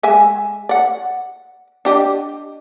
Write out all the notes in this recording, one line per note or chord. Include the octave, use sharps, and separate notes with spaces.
G#3 E5 G#5
D5 F#5
D4 G4 D#5